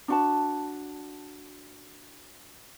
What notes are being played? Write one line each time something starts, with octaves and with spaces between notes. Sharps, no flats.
D4 F#4 A5